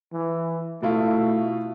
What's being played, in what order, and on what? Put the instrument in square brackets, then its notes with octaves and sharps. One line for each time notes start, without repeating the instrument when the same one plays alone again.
[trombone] E3
[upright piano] B2 E4 F4 [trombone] A3